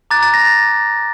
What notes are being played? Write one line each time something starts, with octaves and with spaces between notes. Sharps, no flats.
A#5 D6 F#6 A6
A6
A#6
A6